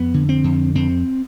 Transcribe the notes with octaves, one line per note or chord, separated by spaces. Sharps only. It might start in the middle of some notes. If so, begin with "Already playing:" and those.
Already playing: F2 B3
D3
C4
F2
F2 C4